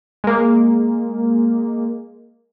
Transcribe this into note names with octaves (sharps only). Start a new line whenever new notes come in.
G#3 A#3